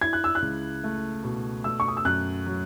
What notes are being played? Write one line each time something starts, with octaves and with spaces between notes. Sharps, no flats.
E4 G#6
F#6
E6
F#6
C#2
A3
B2
A3 E6
C#6
D#6
E6
F#2 F#6
F#3